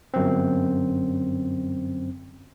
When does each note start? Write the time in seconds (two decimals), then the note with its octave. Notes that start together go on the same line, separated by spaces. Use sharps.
0.14 G1 F#2 C4